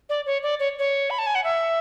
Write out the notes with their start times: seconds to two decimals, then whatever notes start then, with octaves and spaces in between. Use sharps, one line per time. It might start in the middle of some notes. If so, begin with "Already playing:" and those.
0.09 D5
0.26 C#5
0.43 D5
0.59 C#5
0.79 C#5
1.10 B5
1.19 A5
1.27 G#5
1.35 F#5
1.44 E5